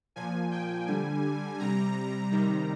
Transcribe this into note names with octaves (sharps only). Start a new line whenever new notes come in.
A#2 F3 G#5
G5
D3 G3 G#5
C3 G3 A#5
C3 D#3 G3